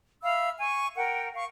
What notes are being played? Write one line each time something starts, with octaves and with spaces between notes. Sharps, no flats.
E5 F5 B5 E6
G#5 C#6
A#4 F#5 G5
F5 C#6